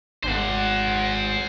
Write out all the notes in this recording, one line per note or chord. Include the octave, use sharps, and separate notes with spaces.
G#1 C5 F#5